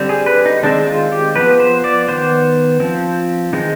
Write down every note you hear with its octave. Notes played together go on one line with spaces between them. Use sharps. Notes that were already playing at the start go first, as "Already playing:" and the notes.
Already playing: D3 G3 C4
G#4
B4
D#4
D#3 G#3 C4 D4
F4
G4
F3 B3 B4
C5
D5
D#3 B3 C5
F3 C4
D#3 G#3 C4 D#4